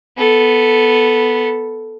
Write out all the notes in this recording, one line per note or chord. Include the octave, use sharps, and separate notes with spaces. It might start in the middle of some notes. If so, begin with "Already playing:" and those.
B3 A4